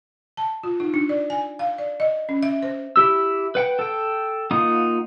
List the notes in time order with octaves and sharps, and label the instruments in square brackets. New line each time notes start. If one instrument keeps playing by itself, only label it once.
[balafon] A5
F4
D#4
D4
D5
G#5
F5
D5
D#5
C#4
E5
C5
[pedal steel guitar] E4 G4 E6
B4 F#5 G5
A4 G5
A#3 D#4 F4 F#5 D#6